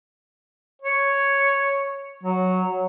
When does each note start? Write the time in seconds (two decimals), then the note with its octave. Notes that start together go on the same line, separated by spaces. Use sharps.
0.82 C#5
2.24 F#3